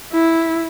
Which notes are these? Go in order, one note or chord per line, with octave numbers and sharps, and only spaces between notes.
E4